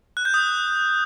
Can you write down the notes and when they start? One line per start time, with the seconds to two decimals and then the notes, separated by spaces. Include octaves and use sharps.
0.17 F#6
0.25 G6
0.34 D#6